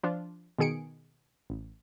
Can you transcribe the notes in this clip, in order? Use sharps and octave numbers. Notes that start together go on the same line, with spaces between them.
F3 D4 F4
B2 D#3 G#4 C#7 D7
A1